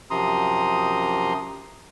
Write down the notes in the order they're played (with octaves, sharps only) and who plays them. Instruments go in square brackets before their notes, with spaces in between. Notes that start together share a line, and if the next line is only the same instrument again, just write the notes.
[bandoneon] F#2 C3 F3 A#5 C6 D#6